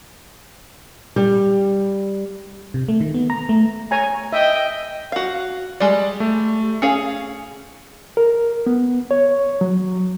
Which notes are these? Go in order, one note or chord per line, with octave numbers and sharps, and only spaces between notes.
G3
C3
A3
D#3
B3
A#5
A3
C#5 G#5 A#5
D#5 E5 G5
F#4 F5
G3 G#3 D5
A3
C#4 G#4 F5 C#7
A#4
B3
C#5
F#3